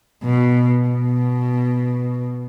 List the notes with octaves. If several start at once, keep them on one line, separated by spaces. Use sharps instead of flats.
B2
B2